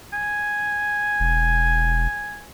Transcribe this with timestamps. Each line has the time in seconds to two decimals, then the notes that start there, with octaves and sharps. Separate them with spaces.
0.13 G#5
1.20 E1